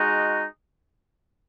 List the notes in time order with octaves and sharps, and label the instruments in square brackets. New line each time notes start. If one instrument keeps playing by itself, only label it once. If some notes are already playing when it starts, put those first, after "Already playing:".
Already playing: [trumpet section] G#3 D#4 F#4